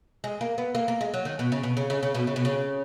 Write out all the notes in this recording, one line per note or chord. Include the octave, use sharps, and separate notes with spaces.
G#3
A#3
B3
A#3
A#3
G#3
F#3
D#3
B2
C#3
B2
C#3
C#3
C#3
B2
C#3
B2
C#3